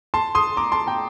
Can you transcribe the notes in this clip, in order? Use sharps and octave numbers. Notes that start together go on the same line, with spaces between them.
A5 C6
C6 D#6
A#5 D6
A5 C6
G5 A#5